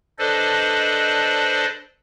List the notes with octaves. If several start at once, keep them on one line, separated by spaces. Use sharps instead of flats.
D4 A4 B4 C5 D5 D#5